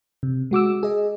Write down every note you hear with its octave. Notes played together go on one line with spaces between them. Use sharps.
C3
G#3 F#4 D6 E6
G#4 D#5